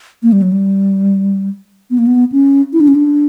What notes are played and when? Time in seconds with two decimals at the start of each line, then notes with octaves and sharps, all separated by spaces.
0.23 A#3
0.32 G3
0.42 F#3
0.52 G3
1.90 B3
1.98 A#3
2.07 B3
2.32 C#4
2.73 E4
2.80 D4
2.88 C#4
2.95 D4